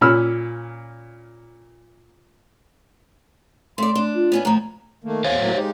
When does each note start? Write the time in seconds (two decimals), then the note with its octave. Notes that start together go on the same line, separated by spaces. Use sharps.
0.01 A#2 C#4 B5 E6 F6
3.78 A3 D5 C6
3.95 D4
4.15 F4
4.32 B3 C#4 D4
4.45 A2 F3 A#5
5.04 D#3 A3 A#3
5.24 E2 C5 C#5 F5 G#5
5.39 A2 F#3 A#3
5.56 G#3 D#4 G4